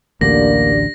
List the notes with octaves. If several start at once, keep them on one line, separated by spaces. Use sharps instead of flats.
A1 D2 D3 A#3 D4 G4 D5 A#6